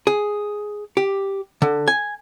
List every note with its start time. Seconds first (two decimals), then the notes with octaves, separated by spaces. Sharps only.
0.07 G#4
0.97 G4
1.62 D3
1.88 G#5